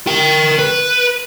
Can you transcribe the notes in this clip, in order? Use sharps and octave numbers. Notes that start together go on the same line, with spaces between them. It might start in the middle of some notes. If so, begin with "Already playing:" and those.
A#4 G5
B4